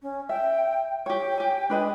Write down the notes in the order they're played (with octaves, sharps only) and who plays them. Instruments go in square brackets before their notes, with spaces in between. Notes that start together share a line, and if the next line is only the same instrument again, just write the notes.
[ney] C#4
[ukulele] E5 [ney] G5
[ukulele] G4 C#5 [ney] G5
[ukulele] G4 G#5
[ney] G#3 [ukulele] D4 B4 D#5